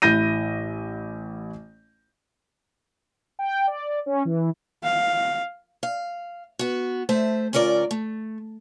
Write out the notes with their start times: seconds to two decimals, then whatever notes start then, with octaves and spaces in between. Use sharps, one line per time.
0.02 A1 E4 G6 A#6 D#7
3.39 G5
3.67 D5
4.06 C#4
4.25 E3
4.83 F5
5.83 F5
6.59 B3 F#4
7.09 A3 C5 E5
7.53 D2 C#4 F4 A#4 D5
7.91 A3